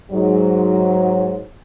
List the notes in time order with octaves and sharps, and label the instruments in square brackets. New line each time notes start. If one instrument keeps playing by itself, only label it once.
[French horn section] G#2 F#3